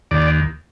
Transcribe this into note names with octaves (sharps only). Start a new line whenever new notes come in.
D#2 D5